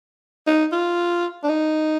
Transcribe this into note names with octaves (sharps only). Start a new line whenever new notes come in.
D#4
F4
D4
D#4